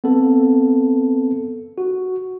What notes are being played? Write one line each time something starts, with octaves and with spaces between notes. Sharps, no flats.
B3 C4 A4
F#4